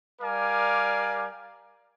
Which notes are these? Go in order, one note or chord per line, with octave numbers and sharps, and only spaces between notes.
G3 A#4 D5 F5 G#5 D6